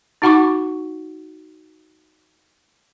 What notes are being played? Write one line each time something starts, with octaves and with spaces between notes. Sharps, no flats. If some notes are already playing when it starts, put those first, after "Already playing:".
D#4 F#4 F#5 B5 C#6 D6